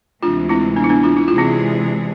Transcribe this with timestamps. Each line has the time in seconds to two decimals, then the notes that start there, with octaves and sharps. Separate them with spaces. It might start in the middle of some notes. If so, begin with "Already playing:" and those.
0.23 D2 C3 E3 G#3 D4 F4
0.49 C4 E4
0.76 B3 D4
0.84 E4
0.89 B3 D4
1.03 D4 F4
1.17 E4
1.28 C3 E3 G#3 D4 F4 G#4
1.38 C4 E4